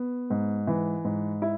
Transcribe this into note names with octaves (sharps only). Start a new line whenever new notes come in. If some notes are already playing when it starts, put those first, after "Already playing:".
Already playing: B3
G#2
E3
G#2
E4